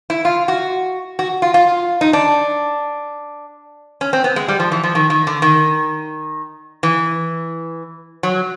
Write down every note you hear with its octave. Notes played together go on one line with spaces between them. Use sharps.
E4
F4
F#4
F#4
F4
F4
D#4
D4
C#4
C4
B3
G#3
G3
F3
E3
F3
D#3
D#3
D3
D#3
E3
F#3